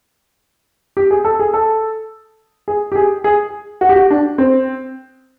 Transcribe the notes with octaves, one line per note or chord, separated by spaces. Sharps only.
G4
G#4
A4
G#4
A4
G#4
G4
G#4
G#4
F#4
G4
F#4
D4
C4